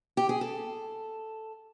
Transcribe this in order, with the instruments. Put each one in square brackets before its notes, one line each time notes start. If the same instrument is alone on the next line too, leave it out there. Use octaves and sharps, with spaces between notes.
[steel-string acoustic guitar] G4
G#4
A4